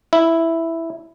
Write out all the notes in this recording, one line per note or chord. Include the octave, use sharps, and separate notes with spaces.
E4